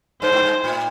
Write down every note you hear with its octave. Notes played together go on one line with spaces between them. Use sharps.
G2 C5
G#2
G2
A2